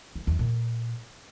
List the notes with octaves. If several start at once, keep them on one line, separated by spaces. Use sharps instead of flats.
D#3
E2
A#2